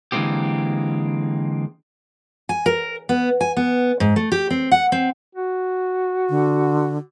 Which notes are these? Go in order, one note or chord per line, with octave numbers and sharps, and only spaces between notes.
D3 E3 G#3 A#3 C4 G4
G#5
A#4
B3
G#5
B3
G#2
A3
G4
C4
F#5
C4
F#4
D3